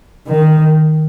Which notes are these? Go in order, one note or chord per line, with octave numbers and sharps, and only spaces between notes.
D#3